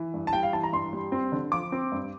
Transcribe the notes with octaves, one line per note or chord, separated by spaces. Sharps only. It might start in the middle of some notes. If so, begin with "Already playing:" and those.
Already playing: E3
G2
A5
G3 G5
F5
E3 A5
A#5
G2 C6
G3
C4
D3
F3 D6
C4
G2